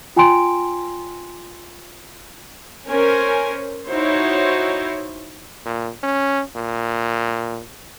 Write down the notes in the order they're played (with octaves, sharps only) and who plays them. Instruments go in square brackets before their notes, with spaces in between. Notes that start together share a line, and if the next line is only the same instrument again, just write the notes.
[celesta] F4 G5 G#5 A#5 C6 D7
[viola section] C#4 A#4 C5 G#5
D#4 E4 F#4 C5 C#5
[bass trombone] A#2
C#4
A#2